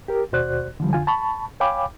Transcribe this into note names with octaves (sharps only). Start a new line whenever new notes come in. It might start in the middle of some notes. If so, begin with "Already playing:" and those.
G4 A#4
D#2 B2 F#4 C5 D5 F#6
D3 E3 F3 G3
F2 D3 F4 G#5
A5 B5 C#6
C#5 F5 G5 G#5 B5 D6